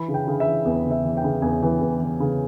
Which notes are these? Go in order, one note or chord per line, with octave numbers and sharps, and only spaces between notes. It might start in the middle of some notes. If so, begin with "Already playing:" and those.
Already playing: E3 B5
C#3
G5
C#3
E5
E3
E2
C#3
E5
E3
G5
C#3
E2 G#5
E3
E2
E3
C#3